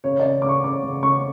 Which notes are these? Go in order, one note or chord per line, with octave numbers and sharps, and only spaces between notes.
C#3 C#5
C#3 D5
C#3 D6
C#6
C#3 D6
C#3
C#3 C#6